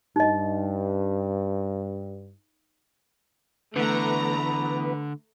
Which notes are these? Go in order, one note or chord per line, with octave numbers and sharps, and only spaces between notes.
G2 D#4 D#5
D3 E3 A3 B3 B4 A#5